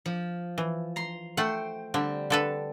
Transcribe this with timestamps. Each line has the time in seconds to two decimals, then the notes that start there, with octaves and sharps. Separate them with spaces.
0.06 F3
0.58 E3
0.96 A#5 C6
1.37 A3 C5 F#5 G5
1.94 D3 G3 C4
2.30 D3 A4 B4